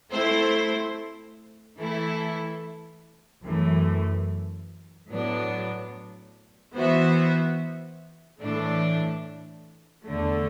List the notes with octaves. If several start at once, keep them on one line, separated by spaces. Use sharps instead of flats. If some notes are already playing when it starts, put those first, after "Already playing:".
A3 C4 E4 A4 C5
E3 A3 E4 A4
F#2 E3 A3
A2 F#3 B3 D4
E3 B3 F#4 C5 E5
A2 E3 A3 D4
E2 D3 A3